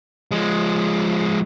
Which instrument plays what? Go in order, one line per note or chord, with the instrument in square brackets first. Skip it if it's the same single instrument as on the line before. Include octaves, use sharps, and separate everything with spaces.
[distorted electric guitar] F3 G#3